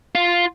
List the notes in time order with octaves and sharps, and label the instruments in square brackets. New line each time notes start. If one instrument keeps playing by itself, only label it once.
[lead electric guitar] F4